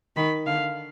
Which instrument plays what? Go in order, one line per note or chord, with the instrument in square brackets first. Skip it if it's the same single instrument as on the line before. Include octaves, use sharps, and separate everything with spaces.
[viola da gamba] D#3 [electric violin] B5
[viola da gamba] D3 [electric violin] F5